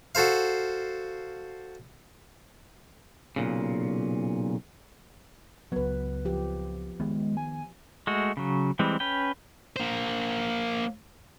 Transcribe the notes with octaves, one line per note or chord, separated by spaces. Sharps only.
F#4 A4 C5 F5
B1 A#2 C#3
C#2 F#3 B3 B4
F3 G4
D#3 G#3 B3
G#5
G#3 A3 F#4
C#3 F#3
E3 G3 G#3 C4
C#4 B4 G5
A#3 C5